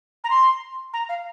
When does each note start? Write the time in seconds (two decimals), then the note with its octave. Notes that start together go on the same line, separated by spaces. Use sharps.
0.24 A#5
0.30 C6
0.93 A#5
1.09 F5